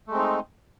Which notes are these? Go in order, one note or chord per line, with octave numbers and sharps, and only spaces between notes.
G#3 A3 C4 D#4